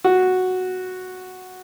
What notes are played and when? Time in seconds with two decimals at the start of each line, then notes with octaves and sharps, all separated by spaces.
0.04 F#4